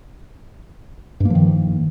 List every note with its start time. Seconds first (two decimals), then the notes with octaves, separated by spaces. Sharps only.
1.20 G2
1.25 A#3
1.30 F3
1.35 D#3